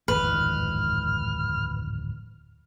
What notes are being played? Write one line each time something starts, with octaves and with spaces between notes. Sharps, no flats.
D1 G#1 F2 B4 F6